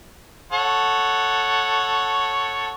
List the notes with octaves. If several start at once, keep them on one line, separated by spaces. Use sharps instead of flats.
A4 C#5 F#5